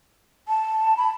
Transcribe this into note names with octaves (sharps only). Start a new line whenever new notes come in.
A5
B5